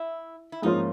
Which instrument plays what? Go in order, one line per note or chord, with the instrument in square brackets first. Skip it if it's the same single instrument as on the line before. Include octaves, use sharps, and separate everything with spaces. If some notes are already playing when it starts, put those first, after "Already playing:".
Already playing: [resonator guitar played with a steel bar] E4
E4
[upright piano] G#2 F3 A#3 C#4 F4 [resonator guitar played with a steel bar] D#4